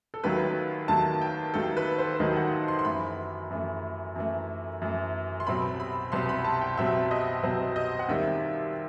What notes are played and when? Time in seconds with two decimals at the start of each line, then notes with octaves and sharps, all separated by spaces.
0.14 A4
0.24 D#2 D#3 F#3 A3 B4
0.88 D#2 D#3 F#3 A3 A5
1.13 A5
1.21 G5
1.54 D#2 D#3 F#3 A3 A4
1.77 B4
1.98 C5
2.20 D#2 D#3 F#3 A3 D#5
2.36 F#5
2.68 C6
2.79 C6
2.85 F#2 E3 A3 B5
3.51 F#2 E3 A3
4.16 F#2 E3 A3
4.82 F#2 E3 A3
5.40 C6
5.47 C2 B2 F#3 C4 B5
5.80 B5
6.12 C2 B2 F#3 C4 C6
6.29 B5
6.45 A5
6.61 G5
6.77 C2 B2 F#3 C4 E5
7.11 D#5
7.43 C2 B2 F#3 C4 C5
7.76 D#5
7.99 F#5
8.08 D#2 D#3 G3 C4 E5